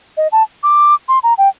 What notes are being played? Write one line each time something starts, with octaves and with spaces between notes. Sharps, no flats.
D#5
A5
D6
C6
A#5
G5